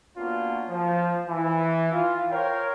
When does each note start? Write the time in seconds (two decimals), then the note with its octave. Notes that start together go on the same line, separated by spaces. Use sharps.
0.17 A#3 B3 C#4 D4 F4 F#4
0.69 F3
1.28 E3
1.92 F4
2.31 A#4 C5 C#5 F5 G5